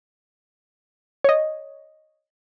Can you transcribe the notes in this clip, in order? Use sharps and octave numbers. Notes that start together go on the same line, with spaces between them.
C#5 D#5